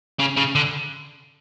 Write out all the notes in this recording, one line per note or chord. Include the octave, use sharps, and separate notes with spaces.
C#3
C#3
D3